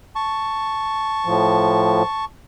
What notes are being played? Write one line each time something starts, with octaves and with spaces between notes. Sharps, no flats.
A5 C#6
A2 F3